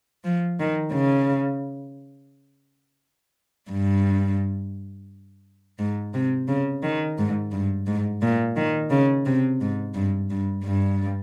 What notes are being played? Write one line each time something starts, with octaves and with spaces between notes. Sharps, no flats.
F3
D#3
C#3
G2
G#2
C3
C#3
D#3
G#2
G2
G#2
A#2
D#3
C#3
C3
G#2
G2
G2
G2